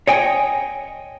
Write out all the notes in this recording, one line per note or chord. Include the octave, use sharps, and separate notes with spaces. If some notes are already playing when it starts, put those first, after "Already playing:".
C#5 D#5 G5 G#5